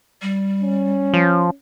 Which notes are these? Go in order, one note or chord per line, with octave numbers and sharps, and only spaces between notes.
G3
C#4
F3